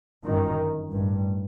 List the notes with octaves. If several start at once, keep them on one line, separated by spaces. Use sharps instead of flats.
G1 F#2 D#3
A1 G2